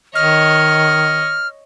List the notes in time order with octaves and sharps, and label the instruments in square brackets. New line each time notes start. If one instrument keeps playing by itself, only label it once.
[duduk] D#3 [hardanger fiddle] C#5 D#5 [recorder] F6